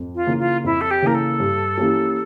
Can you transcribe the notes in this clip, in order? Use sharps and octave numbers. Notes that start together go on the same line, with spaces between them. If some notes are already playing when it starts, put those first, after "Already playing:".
Already playing: F2
F4
C#3 E3 A#3
F4
F2 E4
A4
G4
C#3 E3 A#3 A#4
A4
G2
E3 A#3 C#4 G4